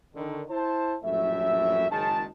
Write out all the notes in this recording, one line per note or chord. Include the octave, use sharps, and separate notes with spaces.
D3 D#3
E4 C5 A5
A#1 F#2 A2 E3 A3 E5
F#1 D#3 G#3 A5